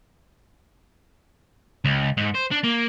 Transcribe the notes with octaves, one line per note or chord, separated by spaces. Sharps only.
C#2
G#2
C5
D4
A#3